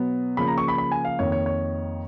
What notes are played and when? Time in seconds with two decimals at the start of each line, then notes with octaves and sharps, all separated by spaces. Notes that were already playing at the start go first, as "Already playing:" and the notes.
Already playing: B2 F#3 B3
0.37 C#3 F3 A#3 B5
0.48 A#5
0.58 C#6
0.68 B5
0.78 B5
0.92 G#5
1.05 F5
1.19 F2 D#3 A#3 C#5
1.32 C#5
1.46 C#5